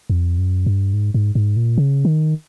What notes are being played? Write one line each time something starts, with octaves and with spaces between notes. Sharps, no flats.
F2
F#2
G2
G#2
G#2
G#2
A#2
C#3
D#3